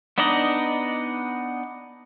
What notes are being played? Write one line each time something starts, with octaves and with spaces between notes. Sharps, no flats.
B3 D4 D#4 D5 D#5